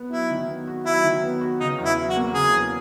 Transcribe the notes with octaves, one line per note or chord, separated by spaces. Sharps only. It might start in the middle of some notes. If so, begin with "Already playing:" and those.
Already playing: B3
F#3 E4
D#3
B3
F#4
F#3 E4
D#3
B3
F#4
C#3 D#4
E2
E4
F#3
F#4
A#3
C#3 G#4
E2